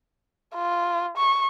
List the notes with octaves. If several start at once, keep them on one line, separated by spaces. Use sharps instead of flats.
F4
C#6